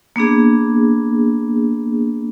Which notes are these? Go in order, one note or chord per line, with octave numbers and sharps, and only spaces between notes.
A#3 B3 D4 G#4